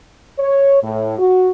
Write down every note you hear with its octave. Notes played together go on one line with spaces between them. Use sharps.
C#5
A2
F#4